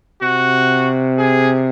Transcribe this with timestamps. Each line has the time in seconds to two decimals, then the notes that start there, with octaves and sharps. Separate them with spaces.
0.22 C3 F#4
1.18 G#4